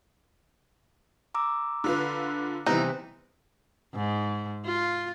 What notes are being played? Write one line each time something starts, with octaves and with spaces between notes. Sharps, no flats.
A#5 D6 E6
D3 F4 B4
C3 E3 G3 B3 D#4 E4 F#6
G#2
F4